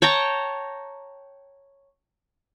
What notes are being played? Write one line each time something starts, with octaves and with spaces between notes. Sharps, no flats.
C#5 G5 A5 A#5